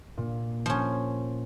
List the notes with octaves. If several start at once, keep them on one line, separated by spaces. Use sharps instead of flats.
A#2
F3 C#4